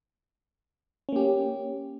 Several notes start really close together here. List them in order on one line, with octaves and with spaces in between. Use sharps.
C#4 A#3 G4